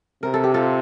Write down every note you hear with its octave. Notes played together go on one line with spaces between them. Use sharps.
C3 A#4
A4
G4
F4 A4